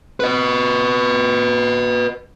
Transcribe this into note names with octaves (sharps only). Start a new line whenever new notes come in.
B4 D#5